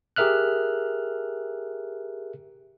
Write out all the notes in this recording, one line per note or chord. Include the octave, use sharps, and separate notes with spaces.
G4 G#4 A#4 E5 F6 F#6